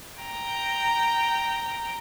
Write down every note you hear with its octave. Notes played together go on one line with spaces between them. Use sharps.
G5 A#5